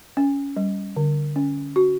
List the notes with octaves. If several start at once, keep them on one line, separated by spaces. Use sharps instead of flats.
C#4
G3
D3
C#4
F#4